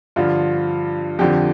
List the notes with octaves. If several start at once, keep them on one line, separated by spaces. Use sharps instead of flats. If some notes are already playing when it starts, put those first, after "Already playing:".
G2 D3 F3 F4
F2 D3 F3 G4